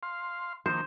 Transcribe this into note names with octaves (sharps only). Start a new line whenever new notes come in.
F5 C6
D#3 F3 A#3 C5